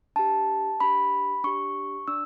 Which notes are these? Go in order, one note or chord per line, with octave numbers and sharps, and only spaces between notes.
D4 G4 A5
D4 G4 B5
D4 G4 C#6
D4 E6